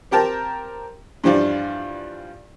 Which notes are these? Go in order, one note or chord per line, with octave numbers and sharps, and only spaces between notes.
C4 G4 A#4 G5 A5 A#5
G2 E3 F3 G3 D4 F4